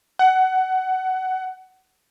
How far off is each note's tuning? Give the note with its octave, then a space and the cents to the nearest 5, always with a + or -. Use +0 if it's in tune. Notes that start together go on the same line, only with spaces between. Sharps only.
F#5 +20